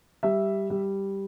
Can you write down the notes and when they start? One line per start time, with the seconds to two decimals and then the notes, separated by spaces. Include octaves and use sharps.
0.23 G3 E5
0.70 G3